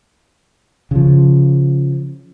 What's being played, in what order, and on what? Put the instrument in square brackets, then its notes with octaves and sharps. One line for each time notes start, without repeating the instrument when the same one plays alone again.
[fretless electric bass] C#3 F3